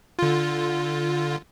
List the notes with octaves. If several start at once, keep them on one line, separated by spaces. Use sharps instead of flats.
D3 F4